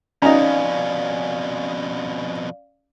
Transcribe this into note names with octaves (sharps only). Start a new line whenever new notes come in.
F2 B2 C#4 D#4 D5 F5 A#5